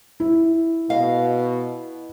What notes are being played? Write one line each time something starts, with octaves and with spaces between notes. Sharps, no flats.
E4
B2 D#5 F5